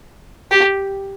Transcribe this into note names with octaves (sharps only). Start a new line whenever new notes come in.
G4